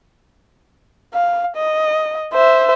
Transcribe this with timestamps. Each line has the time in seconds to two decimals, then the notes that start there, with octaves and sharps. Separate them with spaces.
1.13 F5
1.56 D#5
2.33 C5 E5